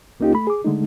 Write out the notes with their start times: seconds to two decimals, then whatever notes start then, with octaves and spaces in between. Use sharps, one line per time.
0.20 C#2 A#3 C#4 D#4 F4 G4
0.34 A3 B5
0.47 G#4 D6
0.65 D3 G#3 A3 D#4